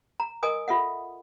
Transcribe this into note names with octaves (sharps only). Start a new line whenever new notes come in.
A#5
A#4 D#5 G#5 D#6
F4 A4 E5 F#5